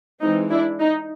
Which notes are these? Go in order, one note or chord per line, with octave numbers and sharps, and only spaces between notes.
E3 G#3 C4 D#4
D4 E4
D#4